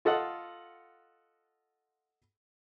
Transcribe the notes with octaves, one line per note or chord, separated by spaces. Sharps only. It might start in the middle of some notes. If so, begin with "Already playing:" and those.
F4 A4 D#5 F#5